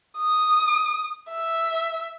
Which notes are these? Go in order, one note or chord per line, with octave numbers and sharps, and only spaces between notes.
D#6
E5